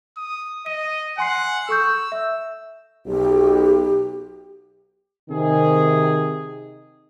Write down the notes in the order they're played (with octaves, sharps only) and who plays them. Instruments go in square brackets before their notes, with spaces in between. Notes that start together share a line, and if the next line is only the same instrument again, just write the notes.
[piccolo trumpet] D#6
[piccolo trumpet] D#5 [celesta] D#7
[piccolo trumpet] F#5 [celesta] G#5 C6 C7
[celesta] A4 C#6 G6 [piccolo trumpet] E6
[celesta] E5
[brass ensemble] B1 [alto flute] G4
[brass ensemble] C3 D#3 G#4